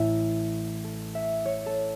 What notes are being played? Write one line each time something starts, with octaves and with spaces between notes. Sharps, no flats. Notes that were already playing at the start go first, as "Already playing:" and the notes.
Already playing: A1 A2 A3 E5
A4
E5
C#5
A4